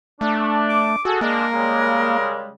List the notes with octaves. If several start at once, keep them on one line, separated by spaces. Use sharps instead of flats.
A3 D4
D6
F#4 G#4 A4
G#3 A#3 D4 A#4
C#3 G3 G#3